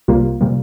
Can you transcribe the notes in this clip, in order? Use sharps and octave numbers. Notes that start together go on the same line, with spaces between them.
C2 C3 G3 A#3 F4
C3 G3 A#3